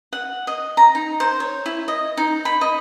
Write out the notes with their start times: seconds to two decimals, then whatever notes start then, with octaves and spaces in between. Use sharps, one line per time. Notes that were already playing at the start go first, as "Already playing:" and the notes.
0.13 F#5
0.47 D#5
0.77 A#5
0.95 D#4
1.20 C5
1.40 C#5
1.66 E4
1.88 D#5
2.17 D#4
2.45 B5
2.61 D#5